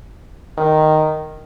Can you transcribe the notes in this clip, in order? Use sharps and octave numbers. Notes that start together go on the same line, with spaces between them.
D#3